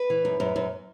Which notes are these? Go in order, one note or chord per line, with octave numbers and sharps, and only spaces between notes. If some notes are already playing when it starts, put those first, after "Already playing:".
Already playing: B4
E3
F#2
F#2
F#2